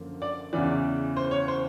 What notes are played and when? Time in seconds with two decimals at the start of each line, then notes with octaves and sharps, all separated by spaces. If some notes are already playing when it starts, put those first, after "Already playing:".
Already playing: F#2 D3 F3 A#3
0.22 D5
0.53 E2 C#3 E3 D5
1.17 C5
1.31 C#5
1.48 C5